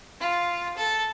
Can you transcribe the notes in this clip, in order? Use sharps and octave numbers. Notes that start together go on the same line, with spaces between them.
F4
A4